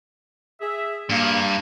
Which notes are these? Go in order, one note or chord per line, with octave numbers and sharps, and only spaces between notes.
G#4 E5
G2 A#3